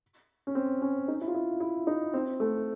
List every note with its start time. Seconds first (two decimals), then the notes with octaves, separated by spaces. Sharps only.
0.47 C#4
0.55 C4
0.82 C#4
1.08 D#4
1.21 E4
1.28 F4
1.34 E4
1.60 E4
1.87 D#4
2.14 C4
2.40 A3